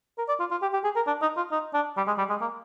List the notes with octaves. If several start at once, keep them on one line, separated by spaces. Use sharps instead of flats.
A#4
D5
F4
F4
G4
G4
G#4
A#4
D4
D#4
F4
D#4
D4
G3
G#3
G3
G#3
A#3